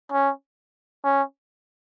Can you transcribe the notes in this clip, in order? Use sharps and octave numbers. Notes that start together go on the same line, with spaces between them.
C#4
C#4